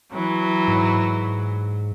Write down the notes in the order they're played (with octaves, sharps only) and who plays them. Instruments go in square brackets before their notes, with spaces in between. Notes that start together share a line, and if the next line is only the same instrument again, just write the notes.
[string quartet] E3 F#3
[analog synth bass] G#2